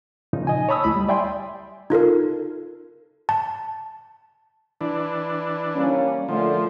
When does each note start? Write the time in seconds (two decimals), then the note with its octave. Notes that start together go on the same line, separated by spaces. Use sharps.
0.33 A#2 C#3 F3 D#4
0.47 D#5 G#5
0.69 C#5 A5 B5 D#6 E6
0.84 D2 A3 E4 B5
0.95 G3
1.08 D5 E5 G5 G#5 C6
1.90 D#4 F4 A4 A#4
3.29 A5
4.81 E3 D4
5.76 G3 A#3 C#4
6.29 A#2 D3 F3 A3